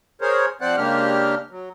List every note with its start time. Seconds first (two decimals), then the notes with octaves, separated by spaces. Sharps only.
0.21 G#4 A#4 C5 C#5
0.61 F3 C4 C5 D5 F#5 F#6
0.77 C#3 G#3 A#3 D4 G4 F6
1.51 F#3